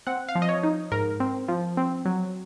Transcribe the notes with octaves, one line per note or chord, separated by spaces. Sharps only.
C4 F#5
F5
F3
D#5
C#5
D#4
G#2 A#4
C4
F3
C4
F#3